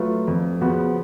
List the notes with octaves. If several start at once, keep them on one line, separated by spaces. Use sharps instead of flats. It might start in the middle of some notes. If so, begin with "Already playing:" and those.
Already playing: F#3 A3 F4 B4
F2
C#3 F3 B3 F#4